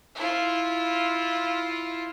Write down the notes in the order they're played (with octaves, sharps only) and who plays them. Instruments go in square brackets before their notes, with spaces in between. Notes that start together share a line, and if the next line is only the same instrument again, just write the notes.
[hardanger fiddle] E4 F4